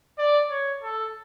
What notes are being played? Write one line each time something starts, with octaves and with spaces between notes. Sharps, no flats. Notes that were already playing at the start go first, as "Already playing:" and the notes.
D5
C#5
A4